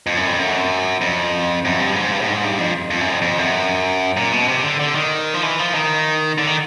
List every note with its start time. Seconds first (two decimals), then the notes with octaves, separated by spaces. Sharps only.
0.07 F2
0.17 F#2
0.27 F2
0.39 F#2
1.01 F2
1.65 F#2
1.80 G2
1.96 G#2
2.12 G2
2.21 A2
2.28 G#2
2.44 G2
2.58 F2
2.91 F2
3.01 F#2
3.11 F2
3.22 F2
3.38 F#2
4.17 A#2
4.32 B2
4.48 C3
4.64 D3
4.80 D3
4.95 D#3
5.34 F3
5.43 E3
5.59 F3
5.75 D#3
6.38 D3
6.47 D#3